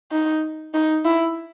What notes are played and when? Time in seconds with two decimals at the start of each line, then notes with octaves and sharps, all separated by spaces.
0.12 D#4
0.74 D#4
1.05 E4